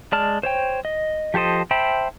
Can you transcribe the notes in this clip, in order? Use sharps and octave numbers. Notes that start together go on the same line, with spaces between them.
G#3 D5 A5 F6
C5 C#5 G5
D#5
F3 G4 A4 C5 D#5
C5 E5 G5 A5 B5